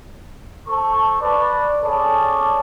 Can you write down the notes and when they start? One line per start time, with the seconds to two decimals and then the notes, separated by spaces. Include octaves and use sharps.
0.67 A4 C5 A5 C#6
1.21 B4 D5
1.83 C#4 G#4 A4 C#5 D5